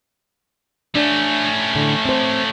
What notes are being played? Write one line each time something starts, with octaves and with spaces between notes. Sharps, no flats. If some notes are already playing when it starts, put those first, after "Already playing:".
A3 C#4 D4
A2 D3
C4 C5